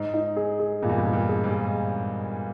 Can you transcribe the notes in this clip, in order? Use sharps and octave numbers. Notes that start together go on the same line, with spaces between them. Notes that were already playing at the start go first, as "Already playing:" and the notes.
Already playing: G#2 D#4
D#4
G#4
G#4
G2 A#2
E2
G2
A#2
G2
G#4
G#2
G#4